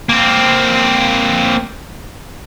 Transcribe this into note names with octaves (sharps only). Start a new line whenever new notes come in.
A#3 C4